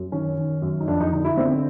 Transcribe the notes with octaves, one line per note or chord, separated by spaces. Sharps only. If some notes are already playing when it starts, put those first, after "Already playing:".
Already playing: F#2
D#3 C#4
D#3
F#2
D#4
F2 D4
D#4
D3 D#4
E4
D3 C4